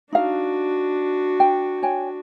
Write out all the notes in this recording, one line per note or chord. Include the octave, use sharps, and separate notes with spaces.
D4 D#4 F#4 F5
G5
C#5 G5 G#5